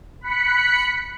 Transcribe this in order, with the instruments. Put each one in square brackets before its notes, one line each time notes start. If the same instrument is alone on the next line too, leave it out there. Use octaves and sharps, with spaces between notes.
[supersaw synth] B5 F#6 B6 C#7